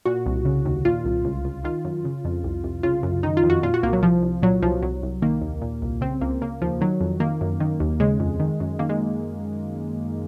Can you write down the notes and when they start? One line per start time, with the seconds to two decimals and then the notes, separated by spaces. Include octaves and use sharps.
0.05 A#2 F#4
0.26 C2
0.45 C#3
0.65 D#2
0.85 A#2 F4
1.05 C2
1.25 C#2
1.45 C#2
1.64 D#3 F4
1.85 F#2
2.05 C#3
2.25 F2
2.44 C2
2.64 C2
2.83 C#3 F4
3.03 F#2
3.23 D#3 D#4
3.37 F4
3.43 F2
3.50 F#4
3.63 A#2 F4
3.74 F#4
3.83 C2 A#3
3.93 F#3
4.02 C2 F3
4.23 C2
4.42 A#2 F#3
4.63 C2 F3
4.83 C2 F#3
5.03 C2
5.22 D#3 A#3
5.42 D#2
5.62 A#2
5.82 C2
6.01 C#3 C4
6.21 C#2 A#3
6.42 C#3 A#3
6.61 D#2 F3
6.81 D#3 F#3
7.00 F2
7.20 D#3 A#3
7.41 F#2
7.60 D#3
7.80 D#2
8.00 C#3 G#3
8.20 F2
8.40 D#3
8.60 F#2
8.79 D#3 A#3
8.89 G#3